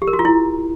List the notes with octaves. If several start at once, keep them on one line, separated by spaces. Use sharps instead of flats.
G4
A#4
F#4
F4
E4